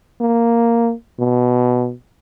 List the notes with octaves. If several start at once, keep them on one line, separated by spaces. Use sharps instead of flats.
A#3
B2